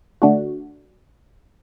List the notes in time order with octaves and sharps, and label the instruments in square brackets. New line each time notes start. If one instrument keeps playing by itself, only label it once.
[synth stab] D3 A3 D4 F#4